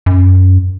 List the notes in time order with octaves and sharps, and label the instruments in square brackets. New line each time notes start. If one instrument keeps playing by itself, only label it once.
[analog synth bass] F#2